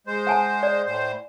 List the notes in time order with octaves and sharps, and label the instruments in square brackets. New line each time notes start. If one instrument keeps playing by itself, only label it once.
[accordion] G#3 C5
[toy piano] F#5 G#5 A5
D5
[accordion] A2 C5